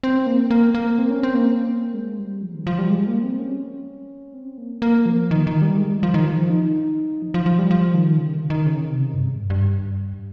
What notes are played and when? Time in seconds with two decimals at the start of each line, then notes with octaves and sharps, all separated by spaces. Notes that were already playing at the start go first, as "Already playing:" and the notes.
0.03 C4
0.27 A#3
0.51 A#3
0.75 A#3
0.99 C4
1.10 C#4
1.23 C4
1.35 A#3
1.94 G#3
2.19 G3
2.42 F3
2.54 D#3
2.67 F3
2.79 G3
2.90 G#3
3.07 A#3
3.23 C4
3.39 C#4
4.34 C4
4.58 A#3
4.82 A#3
5.06 F3
5.31 D#3
5.47 D#3
5.62 G3
5.78 G#3
5.91 G3
6.03 F3
6.14 D#3
6.26 F3
6.50 D#4
7.22 F3
7.34 F3
7.46 F3
7.59 G3
7.71 F3
7.94 D#3
8.18 C#3
8.34 D#3
8.50 D#3
8.66 C#3
8.90 C3
9.14 G2
9.25 G#2
9.38 G2
9.50 G2